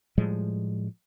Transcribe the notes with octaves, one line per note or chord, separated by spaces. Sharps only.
A2 F3 G3 G#3